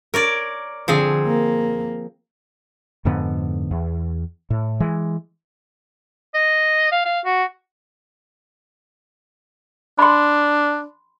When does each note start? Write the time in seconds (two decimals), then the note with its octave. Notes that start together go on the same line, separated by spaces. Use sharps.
0.14 A#4 C#5 D5
0.88 D3 F3 C4 G#4
1.26 A#3
3.05 F2 G#2 D3 B3
3.71 E2
4.50 A2
4.80 E3 G#3
6.34 D#5
6.92 F5
7.05 F5
7.25 F#4
9.99 D4 B5 C6